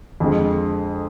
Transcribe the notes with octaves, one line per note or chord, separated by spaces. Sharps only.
F2 D3 G#3